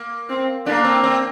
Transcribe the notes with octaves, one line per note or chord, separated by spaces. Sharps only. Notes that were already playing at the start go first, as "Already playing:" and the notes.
Already playing: A#3
C4
A#3 D4
C4
C4